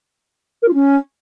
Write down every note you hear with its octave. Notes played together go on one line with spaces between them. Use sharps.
A#4
F4
C#4